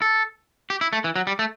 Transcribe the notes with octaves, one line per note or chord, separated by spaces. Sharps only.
A4
G4
E4
A3
E3
F#3
G3
A3